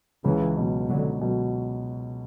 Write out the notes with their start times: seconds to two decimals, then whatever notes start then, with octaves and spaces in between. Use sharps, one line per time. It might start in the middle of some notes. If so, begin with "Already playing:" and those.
0.24 C#2 C#3 E3
0.57 B2 F#3
0.88 C#2 D3 F#3
1.21 B2 F#3